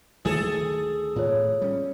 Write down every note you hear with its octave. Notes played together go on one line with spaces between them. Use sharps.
D2 D#3 A3 G#4 A4
A2 F4 C#5
G3 C#4